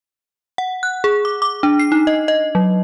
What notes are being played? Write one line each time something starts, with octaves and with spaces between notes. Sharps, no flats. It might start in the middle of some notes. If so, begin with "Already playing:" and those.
F#5
F#6
G#4
D6
D6
D4
C7
D#4
D#5
D#5
F#3